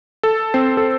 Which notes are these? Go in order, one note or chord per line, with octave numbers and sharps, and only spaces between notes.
A4
C4 C5
A4